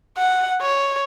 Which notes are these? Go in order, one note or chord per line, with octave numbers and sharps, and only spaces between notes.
F#5
C#5